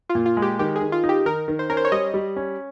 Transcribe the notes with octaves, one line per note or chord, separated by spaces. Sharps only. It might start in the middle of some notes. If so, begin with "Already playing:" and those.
F4
A#2
F4
G#3
G4
D#3 G4
G#4
D#3
F4
D#4
G4
D#3 A#4
D#3
C5
C#4 A#4
C5
C#5
G3 D#5
G3
C#4